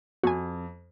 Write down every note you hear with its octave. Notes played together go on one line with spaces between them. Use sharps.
F2 F#4 G#5